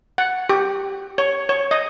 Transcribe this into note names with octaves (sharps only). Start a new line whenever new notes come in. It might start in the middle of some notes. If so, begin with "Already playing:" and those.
F#5
G4
C#5
C#5
D#5